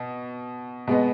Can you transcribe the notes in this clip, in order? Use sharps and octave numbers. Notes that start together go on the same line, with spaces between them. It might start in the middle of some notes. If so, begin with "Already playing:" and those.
Already playing: B2
B2 G#3 B3